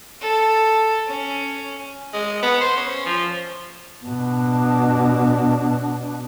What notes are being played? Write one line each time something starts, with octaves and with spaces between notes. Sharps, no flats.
A4
C#4
G#3
B3
C5
C#4
F3
B2 D4